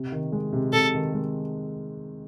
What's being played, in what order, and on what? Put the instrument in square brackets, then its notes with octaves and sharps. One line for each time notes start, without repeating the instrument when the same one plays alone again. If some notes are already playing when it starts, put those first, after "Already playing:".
Already playing: [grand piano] C3
D#3
G#3
C3
[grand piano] C3 [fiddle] A4
[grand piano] D#3
G#3